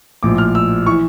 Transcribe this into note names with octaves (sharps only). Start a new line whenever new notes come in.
A#1 A2 F3 D6
F6
E6
E3 C#6